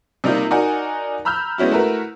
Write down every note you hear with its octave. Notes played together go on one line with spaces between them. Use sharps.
C3 G3 A#3 D#4 F4
D#4 F#4 A#4 D5 F#5 G#5
A#5 B5 E6 F6 G6
G#3 B3 C#4 E4 F#4
A3 E4 F#4 A#4 B4